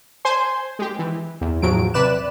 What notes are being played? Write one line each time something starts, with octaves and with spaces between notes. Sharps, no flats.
C5 G#5 C6
G#3 G4
E3
E2
E2 A2 F3 F#3 D7
C3 B4 D5 F#6 E7